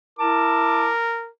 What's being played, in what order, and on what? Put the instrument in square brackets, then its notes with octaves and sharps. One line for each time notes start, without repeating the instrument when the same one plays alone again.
[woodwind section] E4 A5 D6 [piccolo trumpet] A#4